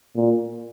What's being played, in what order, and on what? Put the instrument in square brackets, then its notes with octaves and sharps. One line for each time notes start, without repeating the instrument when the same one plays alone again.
[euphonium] A#2